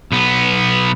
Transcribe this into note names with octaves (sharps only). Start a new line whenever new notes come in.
B1 B3